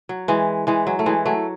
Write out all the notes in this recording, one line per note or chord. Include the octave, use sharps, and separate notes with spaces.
F#3
E3 G#3
E3 G#3
F#3
A3
E3 G#3
F#3 A3